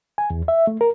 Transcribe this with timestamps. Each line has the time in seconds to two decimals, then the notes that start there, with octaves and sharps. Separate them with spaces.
0.18 G#5
0.30 E2
0.48 E5
0.67 A3
0.81 A#4